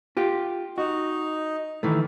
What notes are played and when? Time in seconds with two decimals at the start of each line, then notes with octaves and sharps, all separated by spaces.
0.17 F4 G4
0.78 D#4 F#4
1.83 D#3 E3 A3